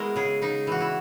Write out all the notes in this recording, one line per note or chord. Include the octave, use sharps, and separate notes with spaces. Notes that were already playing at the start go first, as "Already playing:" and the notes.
Already playing: G#3 B3 E4 F#4 A#4
C#3 G#4
C#3 D#4
E3 F#4
E4